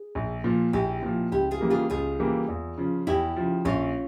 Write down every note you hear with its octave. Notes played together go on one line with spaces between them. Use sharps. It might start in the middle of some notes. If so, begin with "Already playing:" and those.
Already playing: G#4
A#1
A#2 F3
A#1 E4 G4
A#2 F3
C#2 E4 G4
F4 G#4
C#3 E3 G3 A#3
F4 G#4
C#2 F4 G#4
C#3 E3 G3 A#3
E2
C#3 F3
E2 E4 G4
C#3 F3
A#1 C#4 F4